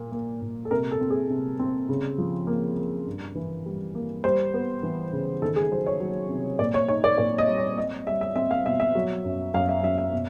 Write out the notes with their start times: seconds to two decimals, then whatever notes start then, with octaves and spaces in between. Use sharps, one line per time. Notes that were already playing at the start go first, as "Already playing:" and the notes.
Already playing: A#2 A#3
0.12 A#3
0.41 A#2
0.65 A4
0.71 C3 A#4
0.91 A4
1.01 C4
1.10 G#4
1.30 C3
1.59 C4
1.89 C#3
2.18 F3
2.47 A#3
2.77 A#3
3.07 G2
3.35 E3
3.66 G3
3.95 A#3
4.24 G3 C5
4.54 B3
4.83 E3
5.13 C#3
5.42 D#3 A4
5.56 G#4
5.71 F#3 C5
5.86 C#5
6.00 F#3
6.30 C3
6.59 A#2 D5
6.74 C#5
6.88 D#4 C#5
7.04 D5
7.18 A#2 D5
7.38 D#5
7.47 G3
7.58 C#5
7.77 C4 D#5
8.07 G3 E5
8.21 E5
8.36 C4 E5
8.51 F5
8.66 B2 E5
8.80 E5
8.95 F#3
9.24 F#2
9.54 F#2 F5
9.69 E5
9.83 F#2 E5
9.98 E5
10.13 B2